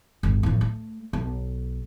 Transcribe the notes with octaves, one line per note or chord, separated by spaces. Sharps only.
G1 D2
A1 F3
A3
B1